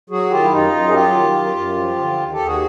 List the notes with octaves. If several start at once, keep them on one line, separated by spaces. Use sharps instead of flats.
F#3 F#4 G#4
D#3 F4 G4
E4
F#2 D#4 F4
F#2
G#4
F#3 F4 G4
D#3
F#2
F#2
F3
D3
D#2
G4 A4
D#2
F#4 G#4